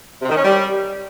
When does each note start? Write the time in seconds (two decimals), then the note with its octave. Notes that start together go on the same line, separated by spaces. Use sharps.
0.22 C3
0.29 D#3
0.37 C#4
0.44 G3